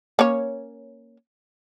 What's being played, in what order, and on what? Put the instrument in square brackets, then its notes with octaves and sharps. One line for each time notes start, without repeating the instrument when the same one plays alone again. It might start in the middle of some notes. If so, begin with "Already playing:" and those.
[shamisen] A#3 C#4 C#5